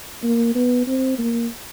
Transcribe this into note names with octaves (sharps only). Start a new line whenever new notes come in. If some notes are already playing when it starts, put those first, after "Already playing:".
A#3
B3
C4
A#3